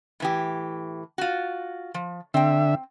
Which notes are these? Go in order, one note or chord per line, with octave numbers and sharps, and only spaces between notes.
A2 E3 G4
F4 F#4
F3
D3 C4 E5 G5